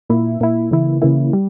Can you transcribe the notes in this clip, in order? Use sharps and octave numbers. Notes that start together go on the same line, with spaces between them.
A#2 A#3 E4
A#2 A#3 E4
C#3 E3 A#3 E4
C#3 E3 A#3 E4
G3